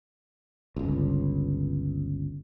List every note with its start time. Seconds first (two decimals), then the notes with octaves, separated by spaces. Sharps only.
0.76 G1 C#2